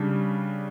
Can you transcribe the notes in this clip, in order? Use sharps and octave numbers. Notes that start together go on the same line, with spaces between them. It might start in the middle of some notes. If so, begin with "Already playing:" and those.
Already playing: C#3 G3 D4